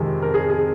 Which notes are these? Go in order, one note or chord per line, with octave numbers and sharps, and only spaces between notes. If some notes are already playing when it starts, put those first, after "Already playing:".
Already playing: F2 C3 D#3 G#3
A#4
G#4
G#4